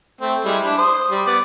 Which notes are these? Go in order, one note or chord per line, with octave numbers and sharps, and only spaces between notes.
A3 C4
G3 G#3 E4
D4 E4
C5 D#6
G3
B3 D5